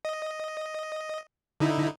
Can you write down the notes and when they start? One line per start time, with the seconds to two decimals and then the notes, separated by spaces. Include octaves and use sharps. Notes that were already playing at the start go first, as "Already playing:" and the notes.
0.05 D#5
1.60 D3 D#4 E4